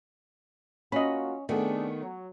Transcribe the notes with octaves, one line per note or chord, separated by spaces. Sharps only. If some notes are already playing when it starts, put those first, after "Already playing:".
A#3 C#4 F4 F#4 D#5 B5
D#3 A3 B3 C4 D4 G#4
F#3